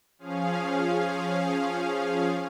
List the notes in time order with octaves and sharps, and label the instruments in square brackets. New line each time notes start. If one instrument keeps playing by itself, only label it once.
[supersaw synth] F3 C#4 G#4 F5